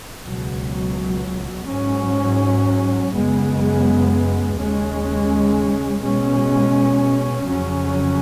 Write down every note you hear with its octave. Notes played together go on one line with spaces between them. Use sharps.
C#2 B2 F#3
G#2 F#3 C#4
F#2 C#3 G#3 B3
D#2 C#3 G#3 C#4
B2 G#3 C#4
F2 C#3 F#3 C#4